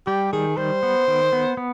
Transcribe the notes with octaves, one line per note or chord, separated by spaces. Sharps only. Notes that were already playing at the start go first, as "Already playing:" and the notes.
G3 G4
D#3 G#4
G3 C5
B3
D#3
B3
B3